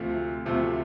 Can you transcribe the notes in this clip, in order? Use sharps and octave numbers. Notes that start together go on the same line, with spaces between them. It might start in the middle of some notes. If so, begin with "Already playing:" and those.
Already playing: D2 C3 F3 A3
D2 C3 F3 A3